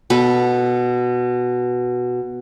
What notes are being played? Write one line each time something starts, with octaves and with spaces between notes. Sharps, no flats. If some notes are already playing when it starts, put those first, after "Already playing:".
B2 A4 B4